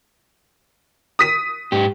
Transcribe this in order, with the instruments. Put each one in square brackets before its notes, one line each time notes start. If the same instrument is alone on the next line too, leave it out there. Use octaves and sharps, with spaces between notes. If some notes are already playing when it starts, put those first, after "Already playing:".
[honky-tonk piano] D#6 B6 D#7
[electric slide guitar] G#2 G4